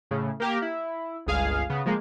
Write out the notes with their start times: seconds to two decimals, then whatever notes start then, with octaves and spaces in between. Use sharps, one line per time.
0.11 A2 C#3
0.40 A#3 G4 A#4
0.62 E4
1.26 G1 C#2 G#4 F5
1.69 C#3 B3
1.85 F3 G#3 A#3